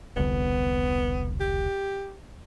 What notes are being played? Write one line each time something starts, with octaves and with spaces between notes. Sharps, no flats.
E1 C2 D3 B3
G4